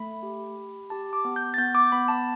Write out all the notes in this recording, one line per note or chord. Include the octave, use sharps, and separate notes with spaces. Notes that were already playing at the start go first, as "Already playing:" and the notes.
Already playing: A3 B5
G4
G4
G4 A5
D6
B3
G6
A6
B3 G6
D6
B3 B5
A5